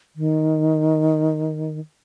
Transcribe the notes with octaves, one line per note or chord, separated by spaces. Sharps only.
D#3